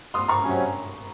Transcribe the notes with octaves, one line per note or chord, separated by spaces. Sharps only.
C6 D#6
A#5 C#6
C3 F#3 C#4